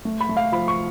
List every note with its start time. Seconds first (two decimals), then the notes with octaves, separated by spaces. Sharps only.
0.05 A3
0.21 B5
0.29 A3
0.37 F5
0.52 F3 B5
0.68 C#6